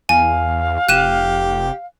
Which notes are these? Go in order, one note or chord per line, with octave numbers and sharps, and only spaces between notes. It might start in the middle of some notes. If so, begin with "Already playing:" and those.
E2 F5 G#5
F1 G4 F#6 D#7 E7